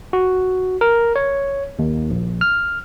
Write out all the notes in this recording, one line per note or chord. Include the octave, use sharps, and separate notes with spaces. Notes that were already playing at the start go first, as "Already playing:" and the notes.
F#4
A#4
C#5
D#2
A#1
F6